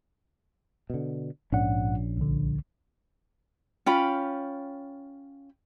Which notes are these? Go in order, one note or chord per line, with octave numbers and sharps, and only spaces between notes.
B2 D3
A#1 G#2 C#4 D4 F#5
C2 D3
C#4 F4 G5 B5